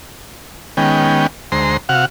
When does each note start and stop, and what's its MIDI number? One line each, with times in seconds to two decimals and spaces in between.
0.77 1.27 51
0.77 1.27 56
0.77 1.27 59
0.77 1.27 61
0.77 1.27 79
1.52 1.77 38
1.52 1.77 56
1.52 1.77 72
1.52 1.77 82
1.52 1.77 84
1.89 2.05 48
1.89 2.05 66
1.89 2.05 77
1.89 2.05 78